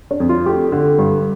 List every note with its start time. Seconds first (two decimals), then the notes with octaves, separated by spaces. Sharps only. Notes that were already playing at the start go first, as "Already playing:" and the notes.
0.11 D4
0.20 F2
0.29 F4
0.46 A3 G4
0.72 D3
0.99 G2